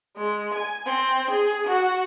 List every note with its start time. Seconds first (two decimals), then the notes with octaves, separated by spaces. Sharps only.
0.16 G#3
0.54 G#5
0.85 C4
1.30 G#4
1.68 F#4